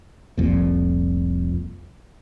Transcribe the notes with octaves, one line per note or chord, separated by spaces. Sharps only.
F1 C2 F2 A#2